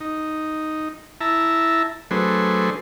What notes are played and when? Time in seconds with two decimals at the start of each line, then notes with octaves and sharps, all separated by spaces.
0.01 D#4
1.21 E4 E5 A5 A#5
2.11 F#3 A3 D4 G#4 B4 C5